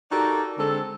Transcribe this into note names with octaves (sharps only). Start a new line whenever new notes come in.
D#4 F#4 G4 A4 A#4 D5
D3 G#3 C4 A4